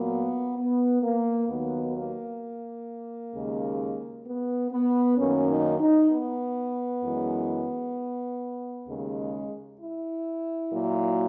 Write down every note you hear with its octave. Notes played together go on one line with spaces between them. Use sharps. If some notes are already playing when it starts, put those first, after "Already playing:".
Already playing: A#2 F#3 A#3 B3
B3
A#3
D#2 D#3 F#3 A#3 B3
A#3
D#2 C#3 G#3
B3
B3
F#2 D#3 A#3 C#4
D#4
D#4
B3
F#2 E3 G#3
D#2 C#3 G#3
E4
A#2 F#3 A#3